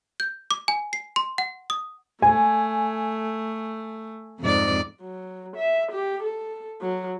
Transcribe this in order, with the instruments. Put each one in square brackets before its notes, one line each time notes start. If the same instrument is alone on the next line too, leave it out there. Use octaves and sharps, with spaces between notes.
[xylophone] G6
D6
G#5
C7
C6
F#5
D#6
[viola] A3 [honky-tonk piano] G#5
[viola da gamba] F2 G#2 D5
[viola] F#3
E5
G4
A4
F#3